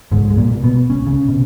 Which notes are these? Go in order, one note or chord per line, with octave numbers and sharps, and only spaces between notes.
C#2 G#2 G#3
G#3
A#2 A#3
B2
B2 B3
C#2 C#4
C#3 C#4
B2